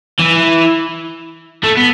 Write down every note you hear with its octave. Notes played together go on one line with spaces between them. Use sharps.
E3
A3
B3